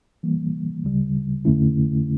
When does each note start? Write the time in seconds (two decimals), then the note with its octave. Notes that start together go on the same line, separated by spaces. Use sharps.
0.23 E3 G3 A#3
0.84 D2 C#3 G3
1.45 F2 D3 A3 C#4 E4